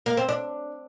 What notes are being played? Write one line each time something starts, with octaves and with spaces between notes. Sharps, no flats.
A#3
C4
D4